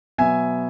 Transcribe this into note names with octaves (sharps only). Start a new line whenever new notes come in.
B2 F#3 B3 E5 G#5